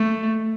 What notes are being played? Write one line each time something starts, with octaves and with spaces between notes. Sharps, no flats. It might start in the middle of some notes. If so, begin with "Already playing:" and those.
Already playing: A3